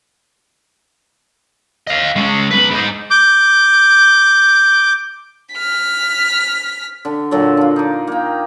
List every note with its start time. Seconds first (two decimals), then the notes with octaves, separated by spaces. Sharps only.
1.87 D#5 F5
2.16 G#3 C#4
2.50 B1 B4
2.71 G#2 D#4
3.11 D6 G6
5.54 F6 B6
7.05 D3
7.31 A#2 D3 F#3
7.57 D4 F4
7.76 D#4 D6
8.07 A#3 G5